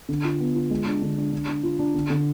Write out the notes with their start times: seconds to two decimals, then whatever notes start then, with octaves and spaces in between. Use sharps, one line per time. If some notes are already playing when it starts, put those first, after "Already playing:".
0.09 D3
0.24 F4
0.40 B3
0.55 F4
0.71 G#3
0.86 D4
1.02 D3
1.17 D4
1.32 D4
1.48 D4
1.63 F4
1.79 D4
1.94 D3
2.10 D3